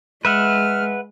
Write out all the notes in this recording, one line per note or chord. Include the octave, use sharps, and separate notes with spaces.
G#3 B4 E5 F#5 F6